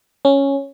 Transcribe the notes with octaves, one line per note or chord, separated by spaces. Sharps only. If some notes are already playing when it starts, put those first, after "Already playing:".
C#4